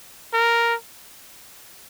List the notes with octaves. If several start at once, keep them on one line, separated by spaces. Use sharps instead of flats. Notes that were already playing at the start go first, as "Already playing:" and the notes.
A#4